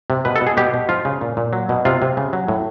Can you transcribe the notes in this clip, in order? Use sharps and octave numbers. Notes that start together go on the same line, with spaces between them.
C3
B2 B4
A4
B2
G#4
B2 G4
B2
F3 F4
C#3
A#2
A#2
F#3
B2
C3 F4
C3
C#3
F#3
A2